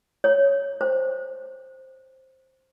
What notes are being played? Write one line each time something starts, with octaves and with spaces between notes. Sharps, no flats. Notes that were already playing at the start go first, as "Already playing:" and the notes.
C#5
C5